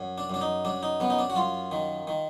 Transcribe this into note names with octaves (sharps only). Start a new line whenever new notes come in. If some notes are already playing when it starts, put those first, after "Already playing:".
Already playing: F#2
D4
F#2 D4
D#4
F#2 D4
D#4
F#2 B3
D#4
D4
F#4
F#2 F4
D#3
D#3